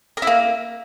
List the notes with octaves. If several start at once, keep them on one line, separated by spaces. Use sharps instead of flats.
A#4
E4
A#3